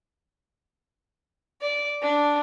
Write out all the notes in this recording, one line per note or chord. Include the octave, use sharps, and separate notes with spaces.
D5
D4